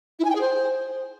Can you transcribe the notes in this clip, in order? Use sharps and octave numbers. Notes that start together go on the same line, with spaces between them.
E4
G#5
G5
G#4
C5